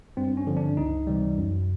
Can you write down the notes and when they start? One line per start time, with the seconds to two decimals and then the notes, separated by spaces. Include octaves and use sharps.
0.17 G2 C4
0.37 C#4
0.47 D3 F3
0.57 D4
0.77 C#2 D#4
1.07 C3 E3 G3
1.38 F#2